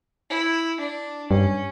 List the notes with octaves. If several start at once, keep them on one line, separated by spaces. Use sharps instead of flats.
E4
D4
G2 C#4